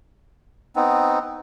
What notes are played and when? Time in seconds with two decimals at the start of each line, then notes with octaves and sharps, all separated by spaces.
0.76 B3 C4 D#4